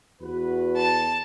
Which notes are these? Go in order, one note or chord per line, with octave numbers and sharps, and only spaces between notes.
E2 F#4 B4
A5